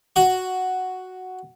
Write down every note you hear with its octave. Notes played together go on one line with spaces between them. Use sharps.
F#4